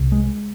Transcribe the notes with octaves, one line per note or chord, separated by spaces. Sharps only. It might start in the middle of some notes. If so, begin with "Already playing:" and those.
Already playing: C2 C3
G#3